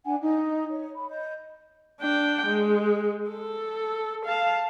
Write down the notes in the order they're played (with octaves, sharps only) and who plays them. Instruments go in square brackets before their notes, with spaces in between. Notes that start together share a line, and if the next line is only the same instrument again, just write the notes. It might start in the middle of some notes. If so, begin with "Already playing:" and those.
[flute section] D4 F#5 G#5
D#4
C#5
B5
D#5 G6
[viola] D4 G5
G#3
A4
F5 A5